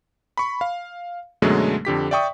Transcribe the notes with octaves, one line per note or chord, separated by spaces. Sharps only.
B5 C#6
F5
F#2 B2 D3 F#3 G#3 A3
F2 D3 G4 B6
D5 E5 G5 C#6 D#6